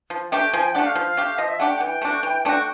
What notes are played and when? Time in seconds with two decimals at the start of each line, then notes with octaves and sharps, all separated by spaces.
0.10 F3
0.31 A3 D4 G4 G5
0.53 F3 G#5
0.64 G5
0.74 A3 D4 G4 F#5
0.86 F5
0.95 F3
1.17 A3 D4 G4
1.38 F3 D#5
1.48 E5
1.59 A3 D4 G4 F#5
1.70 G5
1.77 F#5
1.80 E3
1.86 G5
2.02 A3 D4 F#4
2.23 E3
2.45 A3 D4 F#4
2.55 G5